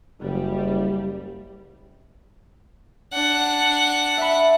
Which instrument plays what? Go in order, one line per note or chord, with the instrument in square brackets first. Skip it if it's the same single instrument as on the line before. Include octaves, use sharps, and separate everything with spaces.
[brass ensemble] F#1 [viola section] G3
[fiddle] D4 F#5
[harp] E5 B5